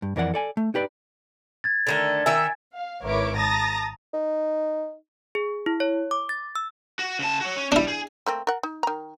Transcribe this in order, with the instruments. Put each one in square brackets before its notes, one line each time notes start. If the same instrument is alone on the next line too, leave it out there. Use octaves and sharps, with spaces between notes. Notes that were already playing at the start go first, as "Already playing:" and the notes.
[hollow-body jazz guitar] G2
F2 E3 A#4 D5 F#5
A4 D5 G#5
A3
D#4 G4 B4 D5
[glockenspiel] G#6 A6
[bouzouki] D3 D#3 A3
[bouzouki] D#3 A#4 E5 [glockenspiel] G#5
[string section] F5
G#1 E4 A#4 B4 C#5 D6
A5 A#5 D#6 A6 A#6
[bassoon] D#4
[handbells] G#4
E4
C#5
D6
A6
E6
[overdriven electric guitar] F#4
C#3 A5
F#4 C#5
C#4
[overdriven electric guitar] G3 [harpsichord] D4 E4
[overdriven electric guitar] G#4
[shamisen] A3 A#3 C4
A#4 F#5
D#4
D#3 A#5